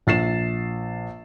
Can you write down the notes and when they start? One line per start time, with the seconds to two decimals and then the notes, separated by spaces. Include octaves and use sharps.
0.07 A#1 A6 C7 E7